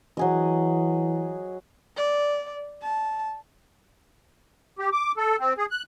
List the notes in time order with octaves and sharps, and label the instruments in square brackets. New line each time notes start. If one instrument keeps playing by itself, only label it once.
[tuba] E3 [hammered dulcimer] F#3 G#4 D#5
[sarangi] D5
A5
[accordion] G4
D6
A4
C4
G#4
F#6